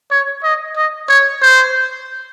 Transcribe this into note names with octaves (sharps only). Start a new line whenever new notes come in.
C#5
D#5
D#5
C#5
C5